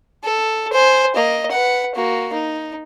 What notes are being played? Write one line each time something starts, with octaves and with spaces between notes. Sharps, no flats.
A4
C5 G#5
A#3 D#5
B4 F#5
A#3 F#4
D#4